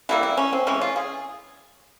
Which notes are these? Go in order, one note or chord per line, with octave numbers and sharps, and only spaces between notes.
E3 G3 A#3 E4
E4
C#4
C4
C#3 E3 G#3 C#4
F4
G#4